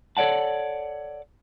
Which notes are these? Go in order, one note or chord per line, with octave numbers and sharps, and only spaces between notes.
A4 C#5 D5 F#5 A5